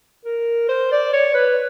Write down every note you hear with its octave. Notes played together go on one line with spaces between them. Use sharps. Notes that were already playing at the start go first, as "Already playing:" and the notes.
A#4
C5
D5
C#5
B4